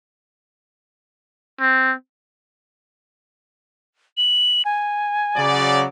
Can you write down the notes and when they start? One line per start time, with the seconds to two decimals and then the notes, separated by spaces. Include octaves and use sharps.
1.59 C4
4.17 F#7
4.65 G#5
5.35 C#3 F#3 D5